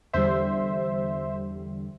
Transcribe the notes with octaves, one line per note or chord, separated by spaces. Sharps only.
E2 D3 G3 C5 E5